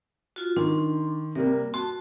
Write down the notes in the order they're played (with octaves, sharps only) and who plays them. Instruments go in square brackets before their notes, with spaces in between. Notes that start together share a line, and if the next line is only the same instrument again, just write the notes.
[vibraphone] F4 F#4
[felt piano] D#3 [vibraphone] D4 C6
[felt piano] C3 G3 A#3 [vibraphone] A#4
[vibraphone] F#4 A5 [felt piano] C6